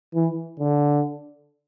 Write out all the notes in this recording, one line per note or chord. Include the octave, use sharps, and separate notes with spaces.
E3
D3